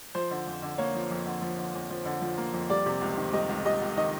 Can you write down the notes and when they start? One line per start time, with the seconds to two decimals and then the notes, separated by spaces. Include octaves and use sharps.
0.15 F3 C5
0.31 D3
0.47 F2
0.62 D3
0.78 A#3 C#5
0.95 F3
1.11 F2
1.26 D3
1.42 F3
1.58 D3
1.74 F2
1.90 F3
2.06 D3
2.22 F3
2.37 A#3
2.53 F2
2.70 G3 D5
2.86 C3
3.01 C#2
3.17 D#3
3.33 G3 D#5
3.49 C#2
3.65 G3 D#5
3.81 C#2
3.97 D#3 D#5